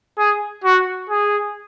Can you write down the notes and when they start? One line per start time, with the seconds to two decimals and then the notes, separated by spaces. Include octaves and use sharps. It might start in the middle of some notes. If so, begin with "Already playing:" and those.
0.18 G#4
0.64 F#4
1.10 G#4